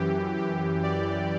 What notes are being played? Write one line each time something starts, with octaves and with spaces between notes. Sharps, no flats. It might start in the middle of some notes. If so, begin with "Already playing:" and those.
Already playing: F#2 E3 G4
G4
D5